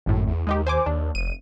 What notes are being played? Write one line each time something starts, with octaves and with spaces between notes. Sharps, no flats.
G#1 F#2 A2
E2
D#2 G#3 D#4 G4
C5 G#5 D6
D#2 D4
F1 D#7